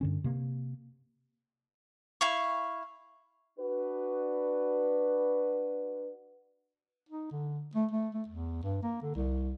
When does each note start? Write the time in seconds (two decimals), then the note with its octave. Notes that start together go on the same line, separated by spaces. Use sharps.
0.01 G2 D3 C#4
0.24 C3 A#3
2.21 E4 F5 C#6
3.59 D4 F#4 B4
7.09 D#4
7.31 D3
7.75 A3
7.91 A3
8.14 A3
8.28 E2
8.64 G2
8.83 A#3
9.02 D3
9.15 C2